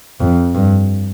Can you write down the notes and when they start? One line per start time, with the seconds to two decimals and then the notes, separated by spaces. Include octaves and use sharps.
0.20 F2
0.55 G2